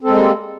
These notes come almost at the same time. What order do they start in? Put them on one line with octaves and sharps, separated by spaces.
C4 A4 G#3 A#3 G3